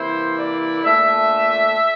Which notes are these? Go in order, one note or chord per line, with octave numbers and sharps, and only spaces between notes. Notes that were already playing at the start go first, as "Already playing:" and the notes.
Already playing: C3 E3 A#3 E4 C5
D5
A#2 A3 D4 E5